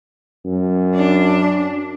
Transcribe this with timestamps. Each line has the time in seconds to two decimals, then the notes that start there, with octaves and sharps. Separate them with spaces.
0.45 F#2
0.95 D4